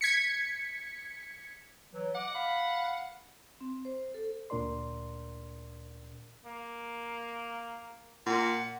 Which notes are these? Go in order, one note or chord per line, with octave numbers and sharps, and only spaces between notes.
G#6 B6 C#7
E3 F#3
D#5 F#5 D6
F5 B5
C4
C5
A4
D2 A#2 D4 A#4 D5 C6
A#3
A#2 F#5